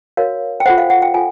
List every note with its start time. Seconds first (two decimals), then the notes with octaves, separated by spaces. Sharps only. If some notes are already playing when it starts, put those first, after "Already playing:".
0.17 F#4 A#4 C#5 F5
0.60 G5
0.66 F4 A4 C5 F#5
0.78 F5
0.90 F#5
1.02 G5
1.14 F4 A4 G#5